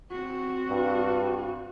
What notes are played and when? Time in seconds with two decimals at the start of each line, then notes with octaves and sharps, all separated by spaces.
0.11 C4 F#4
0.70 G2